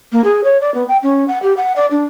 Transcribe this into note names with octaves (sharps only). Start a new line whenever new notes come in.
A#3
G#4
C#5
D5
B3
G5
C#4
F#5
G4
F#5
D5
D4